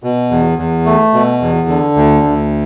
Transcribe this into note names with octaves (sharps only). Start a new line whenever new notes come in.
B2
E2
E2
A3
B2
E2
D3
D2
D2